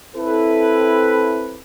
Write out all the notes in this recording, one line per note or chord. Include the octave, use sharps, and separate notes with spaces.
C4 E4 A4 B4